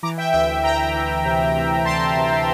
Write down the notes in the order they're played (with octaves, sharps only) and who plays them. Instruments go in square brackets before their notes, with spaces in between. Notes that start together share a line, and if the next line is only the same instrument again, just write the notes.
[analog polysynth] E3 A#5 D6
E5 G5
D2 E5 G5
D2 G5 A#5
E3
C3
C3
D2 A5 C6
C3